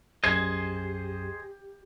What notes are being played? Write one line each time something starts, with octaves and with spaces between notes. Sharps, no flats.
B1 F#2 G4 G#4 C5 D#5 G#5 G#6